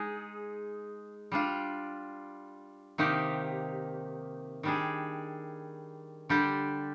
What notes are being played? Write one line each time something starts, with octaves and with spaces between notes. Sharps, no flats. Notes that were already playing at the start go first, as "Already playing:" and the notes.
Already playing: G#3 D#4 G#4
G3 D4 F4
C3 D#3 A#3 D#4 G4
D#3 G3 D4 G#4
D3 G3 D4 G4